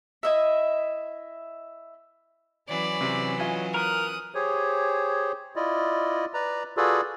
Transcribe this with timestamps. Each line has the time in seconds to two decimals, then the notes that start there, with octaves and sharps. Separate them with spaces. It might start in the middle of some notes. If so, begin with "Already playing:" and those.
0.23 E4 D#5 E5
2.69 E3 F#3 C#4 D5 B5
3.01 C3
3.40 F4 D#5 G#5
3.74 A#4 D#6 F#6
4.35 G4 G#4 C5 C#5
5.56 E4 F4 D5 D#5
6.34 B4 D5 A#5
6.77 F4 F#4 G#4 A4 B4 D5